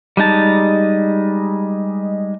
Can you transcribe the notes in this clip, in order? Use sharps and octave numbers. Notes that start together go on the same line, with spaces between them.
G3 G#3 D#4 A5